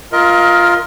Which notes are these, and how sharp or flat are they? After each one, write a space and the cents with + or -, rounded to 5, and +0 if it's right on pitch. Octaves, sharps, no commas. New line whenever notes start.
F4 +0 A#4 +10 D#5 +30